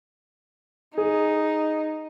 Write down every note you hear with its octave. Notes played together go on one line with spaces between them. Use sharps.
D#4 G#4